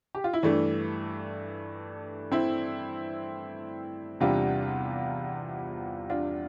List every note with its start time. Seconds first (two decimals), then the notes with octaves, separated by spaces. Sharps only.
0.15 G4
0.24 F4
0.33 E4
0.43 G2 E3 A3 D4
2.32 C4 E4
4.21 E2 C3 G3 D4 F4
6.10 D4 F4